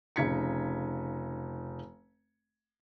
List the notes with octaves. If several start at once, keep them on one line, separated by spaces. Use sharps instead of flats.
F1 C#3 D#4 G#6 B6 C#7